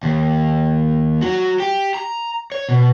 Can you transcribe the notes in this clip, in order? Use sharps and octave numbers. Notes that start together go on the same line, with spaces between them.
D#2
F#3 F#4
G4
A#5
C#5
B2